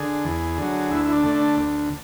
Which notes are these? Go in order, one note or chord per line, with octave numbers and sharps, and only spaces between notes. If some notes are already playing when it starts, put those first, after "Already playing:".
Already playing: D3 G#4
E2
D3 F#3
D2 E4
E4
D4
D3 A3
D4
D2